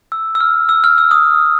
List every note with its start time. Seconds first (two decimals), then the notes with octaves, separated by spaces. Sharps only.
0.12 E6
0.35 E6
0.40 F6
0.69 E6
0.84 F6
0.98 E6
1.11 D#6